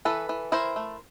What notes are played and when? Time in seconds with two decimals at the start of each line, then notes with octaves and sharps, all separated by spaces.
0.05 E3 A4 B4
0.29 E3
0.52 E4 A#4 C5
0.76 A3